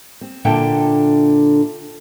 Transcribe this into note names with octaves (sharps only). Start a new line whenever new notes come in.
C4
A#2 D3 D4 A4 E5 G5